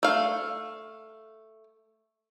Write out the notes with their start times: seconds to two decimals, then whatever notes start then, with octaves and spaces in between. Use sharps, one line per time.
0.03 A3 F5